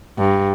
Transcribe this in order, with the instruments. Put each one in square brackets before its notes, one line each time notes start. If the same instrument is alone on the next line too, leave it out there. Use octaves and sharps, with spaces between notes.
[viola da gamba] G2